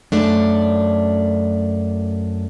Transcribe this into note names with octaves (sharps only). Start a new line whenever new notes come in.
F#2 A3 D4